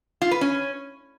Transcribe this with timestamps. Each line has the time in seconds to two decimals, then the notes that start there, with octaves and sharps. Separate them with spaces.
0.22 F4
0.31 B4
0.41 C#4